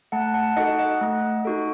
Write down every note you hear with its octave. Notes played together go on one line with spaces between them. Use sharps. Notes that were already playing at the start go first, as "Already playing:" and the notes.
A3 F#5 A5
F#5 A5
D#4 F#4 A4 D#5 F#5
D#5 F#5
A3
D#4 F#4 A4